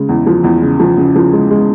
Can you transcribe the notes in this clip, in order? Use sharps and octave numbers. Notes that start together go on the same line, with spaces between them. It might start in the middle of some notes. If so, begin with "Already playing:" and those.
Already playing: C#3 G#3
E2
F3
E2
C#3
F3
C#3
F3
G#3
G#3